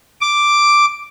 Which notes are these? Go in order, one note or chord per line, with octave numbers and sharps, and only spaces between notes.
D6